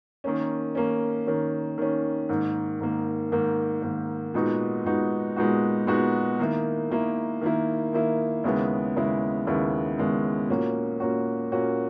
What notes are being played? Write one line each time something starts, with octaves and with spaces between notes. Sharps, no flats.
D#3 A#3 C#4
D#3 A#3 C#4
D#3 A#3 C#4
D#3 A#3 C#4
G#2 D#3 A#3
G#2 D#3 A#3
G#2 D#3 A#3
G#2 D#3 A#3
A#2 G#3 B3 D#4 F#4
A#2 G#3 B3 D#4 F#4
A#2 G#3 B3 D#4 F#4
A#2 G#3 B3 D#4 F#4
D#3 A#3 E4
D#3 A#3 E4
D#3 A#3 E4
D#3 A#3 E4
D#2 C#3 G#3 B3 E4
D#2 C#3 G#3 B3 E4
D#2 C#3 G#3 B3 E4
D#2 C#3 G#3 B3 E4
A#2 A#3 C#4 F#4
A#2 A#3 C#4 F#4
A#2 A#3 C#4 F#4